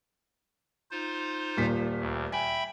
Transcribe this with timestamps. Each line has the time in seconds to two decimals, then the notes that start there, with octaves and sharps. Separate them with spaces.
0.91 D#4 F4 C5
1.57 D#1 A#2 B6
2.00 D2
2.32 E5 G5 G#5 B5